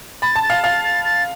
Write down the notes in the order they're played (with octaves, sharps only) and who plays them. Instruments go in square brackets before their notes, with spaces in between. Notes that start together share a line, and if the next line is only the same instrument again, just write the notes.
[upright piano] B5 [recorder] A6
[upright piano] A5
[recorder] A6
[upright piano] F5
[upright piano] F5 [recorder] A6
[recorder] A6
A6